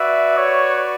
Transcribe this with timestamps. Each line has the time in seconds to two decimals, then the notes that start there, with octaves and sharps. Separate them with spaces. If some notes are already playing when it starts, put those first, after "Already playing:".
Already playing: F#4 B4 D5 E5
0.37 C#5